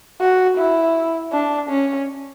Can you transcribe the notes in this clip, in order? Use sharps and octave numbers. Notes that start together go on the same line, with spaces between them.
F#4
E4
D4
C#4